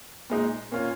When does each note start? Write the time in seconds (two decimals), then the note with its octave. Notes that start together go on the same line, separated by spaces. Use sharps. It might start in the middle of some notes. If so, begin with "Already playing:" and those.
0.30 A#2 G#3 D#4
0.72 A#2 A#3 C#4 F4